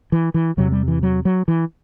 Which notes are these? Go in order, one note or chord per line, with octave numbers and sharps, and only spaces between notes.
E3
E3
E2 C3 F#3
G3
E3
F#3
F#3
E3